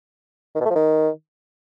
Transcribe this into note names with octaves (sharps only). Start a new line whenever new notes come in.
D#3
B2
A3
F3
D#3